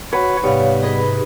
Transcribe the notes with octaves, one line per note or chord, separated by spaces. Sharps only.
F#4 B4 C#5 F#5 C#6
G#2 C3 G3 B3 C#5 F5
G#4 B4 D#5 B5